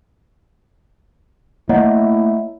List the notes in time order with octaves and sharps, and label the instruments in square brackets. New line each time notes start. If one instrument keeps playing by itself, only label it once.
[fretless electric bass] A3 A#3 [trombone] E4 [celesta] C#5 D#5 F#5